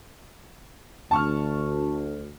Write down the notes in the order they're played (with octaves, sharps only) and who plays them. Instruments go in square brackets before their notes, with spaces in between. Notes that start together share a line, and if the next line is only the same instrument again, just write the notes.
[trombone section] D2 [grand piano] A5 C#6 F6